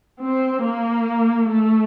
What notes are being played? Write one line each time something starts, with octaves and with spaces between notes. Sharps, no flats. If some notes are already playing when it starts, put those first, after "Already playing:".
C4
A#3
A3